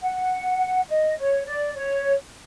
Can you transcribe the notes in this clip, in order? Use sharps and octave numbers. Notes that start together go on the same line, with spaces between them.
F#5
D#5
C#5
D5
C#5